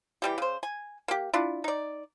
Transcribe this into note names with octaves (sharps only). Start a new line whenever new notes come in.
E3 G3 G4
C#3 C5
G#5
A#3 G4
D4 E4 F4
D#4 D5